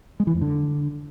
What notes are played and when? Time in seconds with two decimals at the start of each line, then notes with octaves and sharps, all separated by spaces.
0.20 G#3
0.27 E3
0.34 F2
0.42 D3